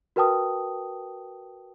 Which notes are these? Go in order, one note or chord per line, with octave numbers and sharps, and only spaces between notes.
F#4 A#4 B4 G5 A5 D#6